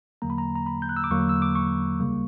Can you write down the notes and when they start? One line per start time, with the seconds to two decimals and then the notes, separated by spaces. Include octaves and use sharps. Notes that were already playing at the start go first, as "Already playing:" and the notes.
0.22 E2 D3 F#3 A#3 A#5
0.30 B5
0.38 A#5
0.55 A#5
0.66 B5
0.82 G6
0.89 F#6
0.97 E6
1.04 D6
1.11 E2 D3 F#3 A#3 C#6
1.29 E6
1.42 D6
1.56 C#6
2.00 D2 C#3 G3 A#3